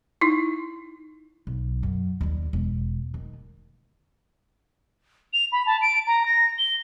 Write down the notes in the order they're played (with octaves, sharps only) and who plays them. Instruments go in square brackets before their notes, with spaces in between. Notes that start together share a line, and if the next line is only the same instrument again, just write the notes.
[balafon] D#4 E4
[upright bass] B1
F#2
D#2 G3
E1
D#3 A3
[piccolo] F7
B5
A5
D7
A#5
A#6
G7